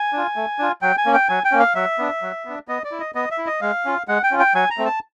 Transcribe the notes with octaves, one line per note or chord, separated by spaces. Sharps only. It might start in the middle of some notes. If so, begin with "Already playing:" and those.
Already playing: G#5
D4 F4
A3
D4 F4
F#3 G5
G#5
A#3 C#4
G5
F#3 G#5
G5
A#3 C#4
F5
F#3 E5
B3 D4
F#3
B3 D4
B3 D#5
D5
E4
D#5
B3 D#5
E5
E4
D#5
G#3 F5
C#4 F4
G#3 F#5
G5
C#4 F4
G5
F#3 G#5
A#5
A3 C4
A5